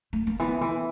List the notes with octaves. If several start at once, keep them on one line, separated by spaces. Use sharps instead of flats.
A3
A#3
E3 B3
E3